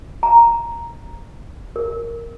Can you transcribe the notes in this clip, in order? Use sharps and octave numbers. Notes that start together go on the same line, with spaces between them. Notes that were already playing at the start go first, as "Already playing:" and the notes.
A#5
A#4